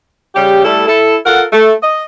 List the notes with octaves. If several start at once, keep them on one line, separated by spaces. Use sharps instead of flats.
C#3 G3 G4
G3 A3 E4 A4
E4 A4
F4 A4 A#4 F#5
A3
D#5